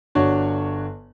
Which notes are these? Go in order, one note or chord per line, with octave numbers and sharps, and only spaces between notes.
G1 D4 F#4 C#5